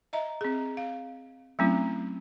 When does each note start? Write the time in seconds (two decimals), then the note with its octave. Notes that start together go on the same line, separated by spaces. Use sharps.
0.13 D#5 E5 A#5
0.41 C4 G#4
0.77 F5
1.59 F#3 A3 C4 C#4 E4